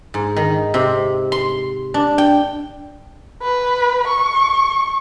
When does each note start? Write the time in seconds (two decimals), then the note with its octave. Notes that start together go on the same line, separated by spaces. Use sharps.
0.14 G#2
0.36 D#3
0.74 C3
1.32 C6
1.94 D4
2.18 G5
3.42 B4
4.07 C#6